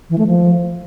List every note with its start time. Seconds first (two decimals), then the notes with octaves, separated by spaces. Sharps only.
0.10 E3
0.18 A3
0.27 F3